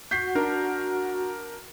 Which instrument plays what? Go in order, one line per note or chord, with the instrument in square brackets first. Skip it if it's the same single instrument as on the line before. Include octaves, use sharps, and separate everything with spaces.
[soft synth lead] F#4 [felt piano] G6 B6 C7
[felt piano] D4 A#4